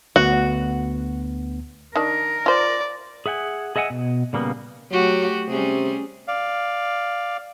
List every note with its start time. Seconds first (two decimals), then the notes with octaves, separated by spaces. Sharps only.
0.16 D2 B3 F#4
1.96 D#3 D4 A#4
2.46 F4 C5 D5
3.26 G#4 E5 F#5 G#5
3.76 G#4 D#5 E5 F#5 G#5
3.90 B2
4.33 A#2 C#3 G3 A#3 B3
4.91 F#3 A3 F#4 G4
5.49 C3 G3 C#4 G#4
6.28 D5 F5